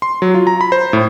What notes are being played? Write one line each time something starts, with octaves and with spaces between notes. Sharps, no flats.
C6
F#3
F4
A#5
B5
C5
A2